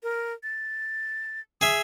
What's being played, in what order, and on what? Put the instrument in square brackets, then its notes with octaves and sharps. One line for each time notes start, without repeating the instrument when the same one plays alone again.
[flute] A#4
A6
[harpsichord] G#4 E5 [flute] D#6